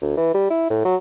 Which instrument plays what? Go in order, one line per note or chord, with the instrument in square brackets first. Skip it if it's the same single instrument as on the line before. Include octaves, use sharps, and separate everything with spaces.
[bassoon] D2
E3
G3
E4
A2
F#3